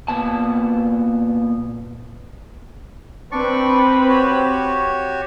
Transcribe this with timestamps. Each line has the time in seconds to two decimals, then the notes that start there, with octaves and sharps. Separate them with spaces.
0.08 A#2 B3 A5
3.32 C4 D4 B4 D5 C#6
4.09 F#4 G4 C#5